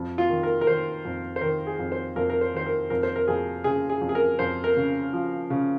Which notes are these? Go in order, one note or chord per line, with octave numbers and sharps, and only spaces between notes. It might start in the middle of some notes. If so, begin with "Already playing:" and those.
Already playing: F2
F4
D#3
A#4
A#4
D#3 C5
F2
C5
D#3 A#4
G#4
F2
C5
F2 A#4
A#4
C5
D#3 C5
A#4
F2 A#4
C5
A#4
F2 G#4
C#3 G#4
G#4
F2
G#4
A#4
F2 C5
A#4
C#3
F3
C#3